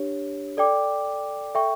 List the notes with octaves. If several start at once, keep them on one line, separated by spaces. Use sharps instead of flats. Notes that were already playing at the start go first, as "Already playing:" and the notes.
Already playing: D4 G4 C#5
A4 D5 G5 D6
A4 E5 G5 C#6